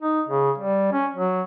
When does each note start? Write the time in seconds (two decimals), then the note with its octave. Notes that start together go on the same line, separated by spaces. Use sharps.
0.02 D#4
0.29 C#3
0.58 G3
0.92 C#4
1.15 F#3